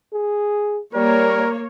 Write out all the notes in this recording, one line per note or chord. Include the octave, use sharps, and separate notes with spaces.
G#4
G3 A#3 A#4 C#5